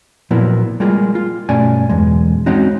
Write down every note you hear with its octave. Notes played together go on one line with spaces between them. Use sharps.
A#2 F3 F#3 A#3 B3 E4
G3 G#3 A#3 F4 G#4
F4
G2 B2 A3 C#4 D5 G#5
B1 E2 G#3
G#3 C4 C#4 D#4 F#4